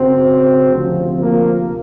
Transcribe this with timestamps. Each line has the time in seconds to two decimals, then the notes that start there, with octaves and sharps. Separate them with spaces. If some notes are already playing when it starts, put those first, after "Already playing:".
Already playing: F#2 C#3 F#3 C4
0.72 D2 C3 F3
1.19 A#3